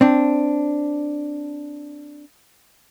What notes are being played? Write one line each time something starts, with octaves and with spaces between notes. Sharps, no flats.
C4 D4